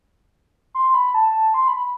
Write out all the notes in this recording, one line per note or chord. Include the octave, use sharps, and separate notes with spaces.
C6
B5
A5
C6
B5